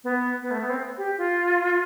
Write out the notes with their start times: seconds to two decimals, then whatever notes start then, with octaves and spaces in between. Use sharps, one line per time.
0.04 B3
0.42 B3
0.51 A3
0.61 B3
0.70 C4
0.98 G4
1.18 F4